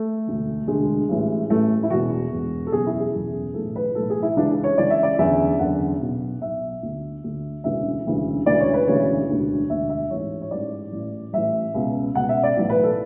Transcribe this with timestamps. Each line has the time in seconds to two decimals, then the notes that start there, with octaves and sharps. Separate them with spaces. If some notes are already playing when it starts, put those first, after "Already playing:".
Already playing: A3
0.27 E1 D2 D3
0.67 E1 D2 D3 G#3
1.09 A1 A2 E3
1.50 A1 A2 E3 A3
1.83 E4
1.90 E1 E2 B2 F#4
2.31 E1 E2 B2
2.67 A4
2.72 F#1 E2 B2 G#4
2.86 E4
3.00 G#4
3.13 F#1 E2 B2
3.54 B1 A2 E3 A4
3.76 B4
3.95 B1 A2 E3 A4
4.10 G#4
4.22 E4
4.36 C#2 C#3 E3 D4
4.64 C#5
4.77 C#2 C#3 E3 D5
4.90 E5
5.03 D5
5.19 F#1 E2 D3 E5
5.59 F#1 E2 D3 F#5
6.00 B1 B2
6.41 B1 B2 E5
6.82 D2 D3
7.24 D2 D3
7.64 E1 D2 C#3 E3 E5
8.06 E1 D2 C#3 E3
8.46 E1 D2 C#3 E3 D5
8.60 C#5
8.74 B4
8.87 E1 D2 C#3 E3 C#5
9.29 E1 D2 D3
9.70 E1 D2 D3 E5
9.89 E5
10.11 A1 G#2 E3 C#5
10.42 C#5
10.51 A1 G#2 E3 D5
10.92 A1 A2 E3
11.33 A1 A2 E3 E5
11.74 C#2 B2
12.15 C#2 B2 F#5
12.29 E5
12.43 D5
12.56 B1 A2 E3
12.70 B4
12.83 A4